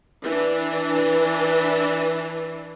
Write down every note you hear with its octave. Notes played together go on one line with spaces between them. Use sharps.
E3 D4